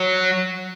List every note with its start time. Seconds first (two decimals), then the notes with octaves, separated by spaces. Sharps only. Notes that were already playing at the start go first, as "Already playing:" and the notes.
Already playing: F#3